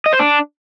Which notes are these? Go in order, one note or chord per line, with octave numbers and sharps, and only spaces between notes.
D#5
C5
D4